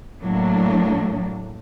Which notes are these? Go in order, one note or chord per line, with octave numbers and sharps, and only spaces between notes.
A2 F#3 A#3 D4